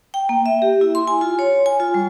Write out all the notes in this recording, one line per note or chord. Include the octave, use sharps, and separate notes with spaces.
G5
A#3
E5
G4
E4
C6
G#5
F4
C#5
G#5
F4
G3